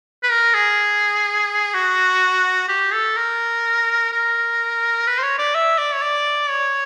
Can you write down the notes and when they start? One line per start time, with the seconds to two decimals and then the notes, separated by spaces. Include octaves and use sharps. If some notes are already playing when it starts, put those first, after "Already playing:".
0.23 B4
0.31 A#4
0.54 G#4
1.74 F#4
2.68 G4
2.93 A4
3.16 A#4
4.12 A#4
5.07 B4
5.19 C5
5.23 C#5
5.39 D5
5.54 E5
5.78 D5
5.94 C#5
6.02 D5
6.50 C#5